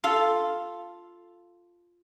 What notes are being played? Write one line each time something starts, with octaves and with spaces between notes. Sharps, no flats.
F4 A4 F5